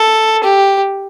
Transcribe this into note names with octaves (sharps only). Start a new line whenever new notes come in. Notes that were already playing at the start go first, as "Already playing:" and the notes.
Already playing: A4
G4